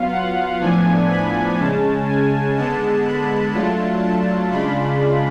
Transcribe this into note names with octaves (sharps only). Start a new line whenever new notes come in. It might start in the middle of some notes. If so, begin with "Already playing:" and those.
Already playing: F#3 B3 F4 F5
F#5
A2 F3 B3 D4 G#5
B5
C#3 G#3 C#4 A5
G#5
D3 G#3 B3 A5
B5
F#3 A3 D4 F4 A5
A5
C#3 G#3 D4 F4 B5